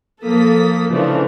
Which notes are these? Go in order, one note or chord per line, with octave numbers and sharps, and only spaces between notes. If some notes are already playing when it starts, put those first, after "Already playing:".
F3 A#3 A4 D#6 B6
C#3 E3 F3 A3 D4